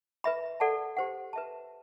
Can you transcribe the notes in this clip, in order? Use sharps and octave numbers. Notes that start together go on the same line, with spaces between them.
B4 E5 B5
A4 D5 F#5 A5
G4 C5 F#5
B4 E5 A5